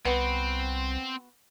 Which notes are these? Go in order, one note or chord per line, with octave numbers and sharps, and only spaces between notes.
C2 B3 C4 F#4